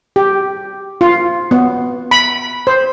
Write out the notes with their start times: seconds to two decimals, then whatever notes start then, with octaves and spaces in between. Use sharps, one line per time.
0.16 G4
1.01 F4
1.51 B3
2.11 B5
2.67 C5